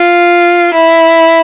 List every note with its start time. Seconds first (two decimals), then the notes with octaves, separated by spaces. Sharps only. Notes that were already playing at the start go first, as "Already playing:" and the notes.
Already playing: F4
0.74 E4